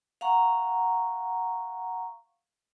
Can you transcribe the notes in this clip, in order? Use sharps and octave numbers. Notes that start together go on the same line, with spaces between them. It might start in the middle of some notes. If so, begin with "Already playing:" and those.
F5 F#5 A#5 C#6